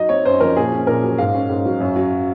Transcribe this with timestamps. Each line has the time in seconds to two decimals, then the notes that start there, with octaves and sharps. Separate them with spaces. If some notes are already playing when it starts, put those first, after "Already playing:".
Already playing: F#3 D#4 D#5
0.09 C4 C#5
0.25 F#2 C5
0.40 F3 A#4
0.56 A#2 G#4
0.72 C#4
0.87 A#2 A#4
1.03 F#3
1.18 G#2 F5
1.34 C#4
1.49 G#2
1.65 F#3
1.80 F#2
1.96 F#3